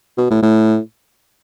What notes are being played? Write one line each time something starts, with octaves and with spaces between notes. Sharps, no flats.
B2
A2
A2